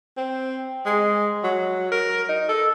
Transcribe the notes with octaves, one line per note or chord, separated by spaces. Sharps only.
C4
G#3
F#3
A#4
D#4
A4